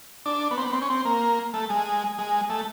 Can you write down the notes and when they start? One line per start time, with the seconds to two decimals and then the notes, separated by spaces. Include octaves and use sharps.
0.26 D4
0.51 B3
0.58 C4
0.66 B3
0.73 C4
0.82 C#4
0.90 C4
1.05 A#3
1.54 A3
1.70 G#3
2.19 G#3
2.50 A3